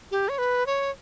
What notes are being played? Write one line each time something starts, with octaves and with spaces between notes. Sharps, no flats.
G4
C#5
B4
C#5